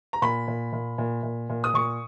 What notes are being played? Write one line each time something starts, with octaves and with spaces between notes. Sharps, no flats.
A#5
A#2 B5
A#2
A#2
A#2
A#2
A#2
D#6
A#2 C#6